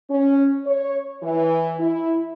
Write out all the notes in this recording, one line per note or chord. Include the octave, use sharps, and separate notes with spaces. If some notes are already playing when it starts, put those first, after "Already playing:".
C#4
C#5
E3
E4